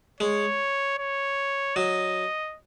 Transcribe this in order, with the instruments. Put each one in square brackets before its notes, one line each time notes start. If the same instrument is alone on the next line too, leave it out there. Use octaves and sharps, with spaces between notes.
[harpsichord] G#3 [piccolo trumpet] C#5
[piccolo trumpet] C#5
[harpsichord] F#3 [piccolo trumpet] D#5